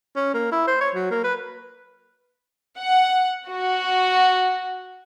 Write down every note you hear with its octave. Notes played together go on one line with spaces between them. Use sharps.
C#4
A#3
E4
C5
C#5
F#3
A#3
B4
F#5
F#4